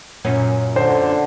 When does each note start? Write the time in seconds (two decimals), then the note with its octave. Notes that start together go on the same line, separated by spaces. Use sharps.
0.25 F#2 A#2 C#4
0.76 D3 C5